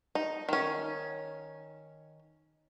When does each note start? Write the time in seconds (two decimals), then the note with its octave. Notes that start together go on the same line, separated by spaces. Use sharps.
0.15 D#4
0.49 D#3 C#4